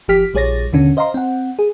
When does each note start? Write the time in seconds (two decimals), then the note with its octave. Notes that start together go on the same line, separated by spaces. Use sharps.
0.08 G1 F3 G4 F6 B6
0.34 A#1 G3 G#4 C#5 A6 A#6
0.73 D#2 B2 D3 C#4
0.97 C5 D#5 F5 A#5 C6
1.14 C4 F#5
1.59 G#4